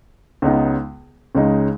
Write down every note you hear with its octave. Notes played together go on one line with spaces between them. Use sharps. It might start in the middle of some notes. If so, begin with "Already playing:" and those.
C#2 C#3 G#3 B3 D#4
C#2 C#3 G#3 D#4